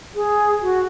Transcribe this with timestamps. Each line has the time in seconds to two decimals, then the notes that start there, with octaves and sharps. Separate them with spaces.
0.15 G#4
0.62 F#4